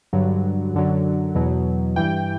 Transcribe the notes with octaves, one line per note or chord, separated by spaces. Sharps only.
G2 D3 F#3
F#2 D3 F#3
E2 B2 F#3
G2 E3 G5